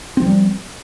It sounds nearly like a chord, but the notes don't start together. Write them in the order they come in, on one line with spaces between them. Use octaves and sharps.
C4 F3 G3